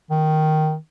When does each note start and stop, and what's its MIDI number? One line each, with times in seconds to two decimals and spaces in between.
0.11 0.76 51